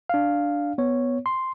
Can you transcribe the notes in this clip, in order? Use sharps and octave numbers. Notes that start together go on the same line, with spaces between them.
D4 F5
B3 C#5
C6